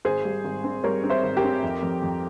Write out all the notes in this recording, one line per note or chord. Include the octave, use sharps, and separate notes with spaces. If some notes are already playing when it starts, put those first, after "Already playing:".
G#1 G#4 C5
G3
G#1
C4
G3 A#4 C#5
C4
C5 E5
G#1
G4 A#4
C4
F2
F2
F2